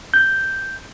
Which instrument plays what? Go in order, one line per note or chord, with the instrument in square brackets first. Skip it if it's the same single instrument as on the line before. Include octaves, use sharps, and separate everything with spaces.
[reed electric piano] G6